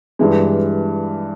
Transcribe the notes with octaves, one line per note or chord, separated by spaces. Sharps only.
G2 E3 G#3